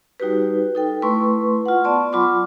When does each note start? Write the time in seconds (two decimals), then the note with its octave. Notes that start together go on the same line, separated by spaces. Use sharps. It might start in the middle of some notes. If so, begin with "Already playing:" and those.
0.20 G3 D#4 F#4 G4 B4
0.75 D#4 A4 G5
1.02 A3 E4 B4 C6 C#6
1.66 F4 F#5
1.84 B3 D5 A5 C6 C#6
2.13 F#3 F4 B5 C6 D6